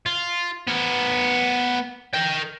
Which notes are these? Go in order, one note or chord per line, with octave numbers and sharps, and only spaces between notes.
F4
B3 A#4
A#4 G5